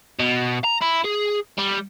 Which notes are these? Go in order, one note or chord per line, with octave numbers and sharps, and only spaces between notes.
B2
A#5
E4
G#4
G3